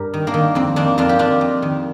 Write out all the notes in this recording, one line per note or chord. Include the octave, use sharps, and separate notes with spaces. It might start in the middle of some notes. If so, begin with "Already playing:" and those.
Already playing: G2 G4 A#4
D#3
A#3 D4
D#3
F2 C4
D#3 A#3 D4
F2 D4 F4
G4
F2 D4 F4
F2
D#3